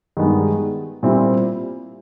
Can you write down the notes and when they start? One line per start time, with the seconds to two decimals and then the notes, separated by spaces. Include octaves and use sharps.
0.17 G2 D#3 G#3 B3
1.03 A#2 G3 C4 E4